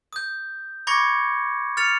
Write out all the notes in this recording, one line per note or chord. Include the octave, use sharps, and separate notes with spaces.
D#6 G6
B5 C#6 D6 G#6 A#6 C#7
F6 A6 C#7 F7